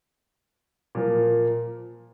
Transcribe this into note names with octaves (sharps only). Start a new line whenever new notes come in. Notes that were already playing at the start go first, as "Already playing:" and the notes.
A#2 F3 A#3